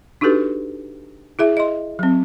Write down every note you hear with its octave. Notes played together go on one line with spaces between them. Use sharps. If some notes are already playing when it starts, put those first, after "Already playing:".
D4 D#4 F#4 G4 A4 B4
E4 G#4 E5
D#5 C6
F#3 C4